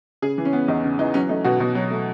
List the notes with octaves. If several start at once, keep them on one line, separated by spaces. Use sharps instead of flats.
C#3 G#4
E3
C#4
B3
E2 D#4
C#3
E3 D#4
F#3 C#4
A3 D#4
B2 F#4
B2
F#3
A3